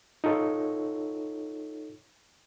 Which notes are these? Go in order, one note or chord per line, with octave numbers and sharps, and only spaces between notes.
D#4 F4 A4 C#5